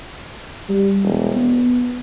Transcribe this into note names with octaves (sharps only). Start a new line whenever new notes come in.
G3
E1
B3